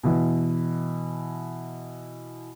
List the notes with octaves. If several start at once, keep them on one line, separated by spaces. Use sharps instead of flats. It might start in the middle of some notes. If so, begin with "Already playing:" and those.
B2 E3